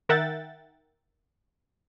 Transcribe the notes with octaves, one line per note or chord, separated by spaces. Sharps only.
D#3 A#4 E5 F#5 G5 A6